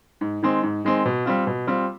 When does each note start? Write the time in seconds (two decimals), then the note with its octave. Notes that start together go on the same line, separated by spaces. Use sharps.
0.21 G#2
0.43 D#3 G#3 C4
0.63 G#2
0.85 D#3 G#3 C4
1.05 B2
1.25 G3 C4 F4
1.47 B2
1.67 G3 C4 F4